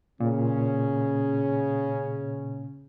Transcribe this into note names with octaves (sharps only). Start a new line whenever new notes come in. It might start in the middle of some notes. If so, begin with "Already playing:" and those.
A#2 C#3 C#4